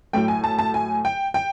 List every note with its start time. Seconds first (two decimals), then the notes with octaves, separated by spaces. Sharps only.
0.13 A2 F#3 A3 G5
0.28 G#5
0.44 A5
0.59 A5
0.74 G#5
1.05 G5
1.34 G5